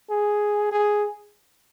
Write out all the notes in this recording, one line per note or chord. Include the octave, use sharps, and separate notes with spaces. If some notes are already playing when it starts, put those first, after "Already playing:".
G#4
G#4